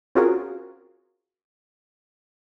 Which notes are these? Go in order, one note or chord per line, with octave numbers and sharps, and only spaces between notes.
C4 C#4 F4 F#4 G#4 A#4